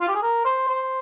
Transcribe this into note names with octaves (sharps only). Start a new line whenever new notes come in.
F4
G4
G#4
A#4
C5
C5